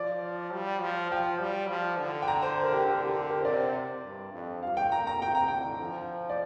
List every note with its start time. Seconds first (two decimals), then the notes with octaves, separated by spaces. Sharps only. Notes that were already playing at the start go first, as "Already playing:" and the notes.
Already playing: F3 D5
0.53 G3
0.81 F3
1.11 F3 G5
1.40 G3
1.69 F3
1.99 D3
2.22 G5
2.28 A#5
2.42 C5
2.63 A#4
2.72 G4
2.86 D3 A#4
3.02 G4
3.16 G4
3.30 A#4
3.41 C5
3.45 C3 D5
4.04 G2
4.34 F2
4.63 G2 F5
4.77 G5
4.92 A#2 A#5
5.07 A#5
5.21 C3 G5
5.35 A#5
5.48 D3 G5
5.80 F3
6.30 D5